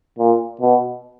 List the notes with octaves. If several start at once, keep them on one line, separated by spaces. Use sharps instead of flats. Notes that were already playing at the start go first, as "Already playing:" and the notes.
A#2
B2